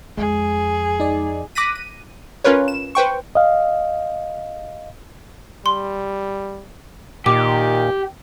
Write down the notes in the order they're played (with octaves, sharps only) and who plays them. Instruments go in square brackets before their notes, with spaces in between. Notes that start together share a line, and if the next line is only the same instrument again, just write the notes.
[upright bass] F2 [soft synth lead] G#3 [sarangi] G#4
[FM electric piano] D#4 D5
[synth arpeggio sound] D6 F#6 A#6 B6 D#7
D#7
C#4 F4 A#4 B4 C#5
E7
B4 C5 G5 C#6
[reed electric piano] D#5 F5
[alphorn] G3 [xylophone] C6
[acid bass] A#2 [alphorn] D#3 [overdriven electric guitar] G4 [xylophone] D6